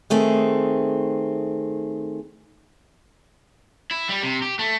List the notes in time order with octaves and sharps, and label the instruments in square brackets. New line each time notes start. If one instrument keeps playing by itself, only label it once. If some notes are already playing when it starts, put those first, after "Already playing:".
[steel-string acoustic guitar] D#3 A3 C4 G#4
[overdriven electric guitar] E4
G3
C3
G4
A3